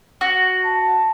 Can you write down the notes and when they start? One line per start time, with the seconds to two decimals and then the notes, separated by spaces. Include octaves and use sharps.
0.21 F#4
0.65 A5